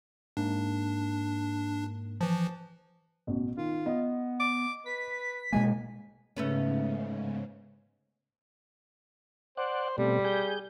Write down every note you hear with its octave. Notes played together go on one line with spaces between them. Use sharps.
G#2 A#3 D4
E3 F3 A5
A1 B2
D#3 F4
B3 D#5
D6
B4 B6
B2 G#3 A#3 G#5
G#2 C#3 A3 B3 C#4
C5 D5 F#5
B2 G3 A3 C4
G#4 G6